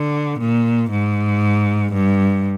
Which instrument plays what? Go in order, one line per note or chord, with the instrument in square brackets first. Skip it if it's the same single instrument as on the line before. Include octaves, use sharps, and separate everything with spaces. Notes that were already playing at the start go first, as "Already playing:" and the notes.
Already playing: [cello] D3
A#2
G#2
G2